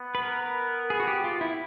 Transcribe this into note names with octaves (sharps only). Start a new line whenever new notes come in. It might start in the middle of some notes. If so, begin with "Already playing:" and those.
Already playing: B3
B4
A#4
G#4
F#4
G4
F4
E4